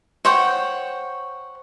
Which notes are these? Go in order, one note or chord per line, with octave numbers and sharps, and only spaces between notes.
C5 C#5 F#5 G5